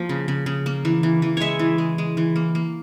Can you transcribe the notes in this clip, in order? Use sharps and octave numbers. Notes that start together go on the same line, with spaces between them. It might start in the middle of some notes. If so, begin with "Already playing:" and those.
Already playing: F3 A#3
C#3
C#3
C#3
A#3
E3
E3
E3
G#3 C#5 E5
E3
G#3
G#3
E3
A#3
A#3